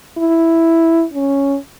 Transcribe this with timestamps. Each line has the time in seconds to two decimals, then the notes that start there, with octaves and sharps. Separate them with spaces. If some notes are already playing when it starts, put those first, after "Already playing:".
0.17 E4
1.13 C#4